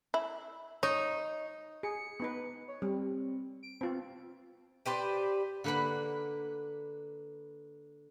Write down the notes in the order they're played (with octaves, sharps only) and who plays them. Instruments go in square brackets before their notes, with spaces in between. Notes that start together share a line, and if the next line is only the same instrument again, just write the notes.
[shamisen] E4
[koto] D#4 [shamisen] C#5
[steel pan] G#4 [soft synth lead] C#7
[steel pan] B3 D#4 B4
[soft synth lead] C#5
[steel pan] G3 [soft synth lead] C4
[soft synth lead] D7
[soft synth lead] B3 [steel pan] C4 F4
[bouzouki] G4 B4 C5 D5
[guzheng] D3 A#3 B4 F#5 B5